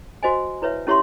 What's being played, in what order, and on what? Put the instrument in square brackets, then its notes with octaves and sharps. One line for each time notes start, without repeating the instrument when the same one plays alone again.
[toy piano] F#4 C5 D#5 G#5
E4 B4 C#5 E5
C#4 E4 G4 C#5 E5 C6